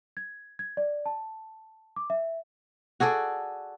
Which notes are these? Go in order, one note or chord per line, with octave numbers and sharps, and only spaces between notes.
G#6
G#6
D5
A5
D6
E5
F#4 G#4 A4 D5